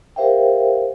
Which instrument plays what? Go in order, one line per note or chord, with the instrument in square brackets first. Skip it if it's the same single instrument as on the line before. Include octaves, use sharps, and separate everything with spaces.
[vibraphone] G4 A#4 C5 E5 F5 G5